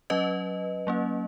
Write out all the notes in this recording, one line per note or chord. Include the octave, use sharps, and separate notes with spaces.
F#3 C#4 B4 D#5
F#3 A#3 C#4